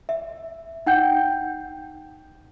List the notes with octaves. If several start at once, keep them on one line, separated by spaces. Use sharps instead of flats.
E5
D#4 F#5 G5 G6